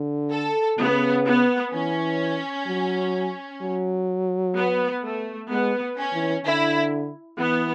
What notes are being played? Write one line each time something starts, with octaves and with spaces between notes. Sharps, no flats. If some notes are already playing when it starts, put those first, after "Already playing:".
Already playing: D3
A4
C#3 B3
B3
E3 C#4
F#3
F#3
B3
A3
G#3 B3
C#4
E3
D3 E4
E3 B3